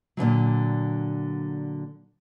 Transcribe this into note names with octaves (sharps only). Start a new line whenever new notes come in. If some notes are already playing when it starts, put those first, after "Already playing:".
A#2 D3 E3 F#3